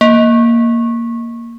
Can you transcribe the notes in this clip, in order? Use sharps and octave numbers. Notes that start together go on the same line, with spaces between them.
A#3